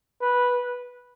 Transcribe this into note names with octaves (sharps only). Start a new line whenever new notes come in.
B4